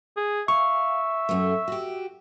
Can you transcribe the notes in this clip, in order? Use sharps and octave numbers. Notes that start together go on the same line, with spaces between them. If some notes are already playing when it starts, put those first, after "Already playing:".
G#4
E5 F5 C#6
F#2 A3
F#4 G4